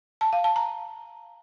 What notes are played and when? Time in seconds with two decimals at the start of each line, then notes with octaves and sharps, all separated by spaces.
0.21 A5
0.33 F5
0.44 A5
0.56 A#5